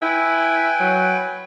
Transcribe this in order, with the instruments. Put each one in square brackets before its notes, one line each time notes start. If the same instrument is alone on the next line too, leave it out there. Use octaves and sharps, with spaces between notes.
[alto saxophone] E4 [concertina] B4 G5 G#5
[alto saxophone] F#3